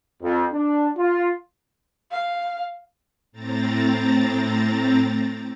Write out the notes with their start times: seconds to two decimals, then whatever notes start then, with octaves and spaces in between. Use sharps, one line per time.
0.23 F2
0.52 D4
0.97 F4
2.11 F5
3.32 A2 C4 A#5 A6